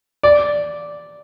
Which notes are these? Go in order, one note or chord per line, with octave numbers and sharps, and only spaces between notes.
D5